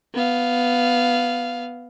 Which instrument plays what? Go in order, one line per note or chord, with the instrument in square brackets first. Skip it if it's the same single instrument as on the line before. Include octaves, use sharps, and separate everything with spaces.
[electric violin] B3 F5